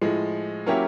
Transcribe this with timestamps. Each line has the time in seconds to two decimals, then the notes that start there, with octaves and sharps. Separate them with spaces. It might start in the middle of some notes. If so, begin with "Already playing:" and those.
0.01 A2 F3 G#3
0.66 F#3 A#3 C#4 E4 G4